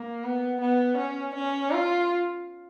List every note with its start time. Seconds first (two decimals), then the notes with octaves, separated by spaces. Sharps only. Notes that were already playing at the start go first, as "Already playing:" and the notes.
Already playing: A#3
0.24 B3
0.61 B3
0.98 C#4
1.35 C#4
1.72 F4